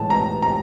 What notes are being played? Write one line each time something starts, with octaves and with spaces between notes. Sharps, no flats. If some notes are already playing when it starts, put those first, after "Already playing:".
Already playing: A2 E3 G#3 A5
A#5
A#5